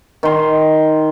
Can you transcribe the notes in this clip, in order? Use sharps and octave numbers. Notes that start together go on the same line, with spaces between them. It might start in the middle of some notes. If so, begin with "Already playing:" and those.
D#3 C6